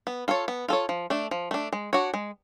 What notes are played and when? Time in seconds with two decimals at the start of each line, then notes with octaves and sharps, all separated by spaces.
0.07 B3
0.28 F4 A4 C#5
0.48 B3
0.68 F4 A4 C#5
0.89 F3
1.10 A3 D4
1.31 F3
1.51 A3 D4
1.73 G#3
1.93 D4 F#4 C#5
2.14 G#3